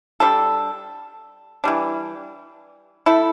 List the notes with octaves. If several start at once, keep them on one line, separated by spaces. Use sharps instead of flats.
G3 D4 A4
E3 G3 D4
A3 E4 A4